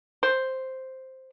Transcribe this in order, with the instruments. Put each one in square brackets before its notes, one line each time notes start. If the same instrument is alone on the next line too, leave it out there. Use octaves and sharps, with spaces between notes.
[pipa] C5